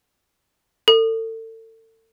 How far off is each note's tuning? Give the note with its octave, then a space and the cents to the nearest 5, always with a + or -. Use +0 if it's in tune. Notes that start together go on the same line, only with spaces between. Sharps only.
A4 +35